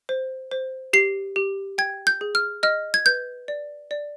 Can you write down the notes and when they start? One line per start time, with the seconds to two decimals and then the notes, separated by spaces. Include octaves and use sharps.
0.09 C5
0.51 C5
0.93 G4 C7
1.36 G4
1.78 G5 G#6
2.07 G6
2.21 G#4
2.35 F6
2.63 D#5 F6
2.94 G#6
3.06 B4 G6
3.48 D5
3.91 D5